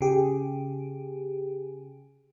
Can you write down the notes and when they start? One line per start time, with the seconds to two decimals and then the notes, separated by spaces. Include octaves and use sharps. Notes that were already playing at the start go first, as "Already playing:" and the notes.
0.01 C#3 G4 G#4